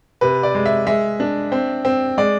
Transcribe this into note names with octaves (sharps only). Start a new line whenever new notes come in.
C3 B4
D5
G#3
E5
G#3 E5
D4
C4
C4
G#3 D5